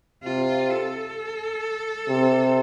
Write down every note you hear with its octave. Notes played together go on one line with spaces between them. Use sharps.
C3 F4
A4
C3